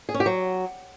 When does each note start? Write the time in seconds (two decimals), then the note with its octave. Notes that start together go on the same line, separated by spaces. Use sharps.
0.09 G#4
0.14 C#4
0.20 G4
0.26 F#3